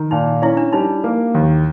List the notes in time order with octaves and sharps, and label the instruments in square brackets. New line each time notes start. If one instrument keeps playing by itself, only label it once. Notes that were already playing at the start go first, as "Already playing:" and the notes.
Already playing: [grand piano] D#3
[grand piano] A#2 [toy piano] D#4
[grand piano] C#4 [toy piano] E4
[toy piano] D4
[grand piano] G3 [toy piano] D#4
[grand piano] A#3
D#2